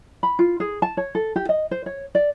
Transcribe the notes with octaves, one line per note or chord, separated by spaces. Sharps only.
B5
F4
G#4
A5
C#5
A4
G4
D#5
C5
C#5
D5